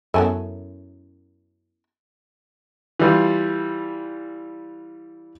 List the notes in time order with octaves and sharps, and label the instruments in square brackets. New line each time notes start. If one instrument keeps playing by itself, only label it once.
[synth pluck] F#2 [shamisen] B3 C#4 E4 [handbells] A4 G#5 A5
[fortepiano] E3 G3 F4